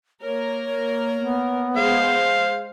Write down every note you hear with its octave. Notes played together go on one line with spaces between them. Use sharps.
A#3 A#4 C#5
B3
G#3 G#4 C5 F5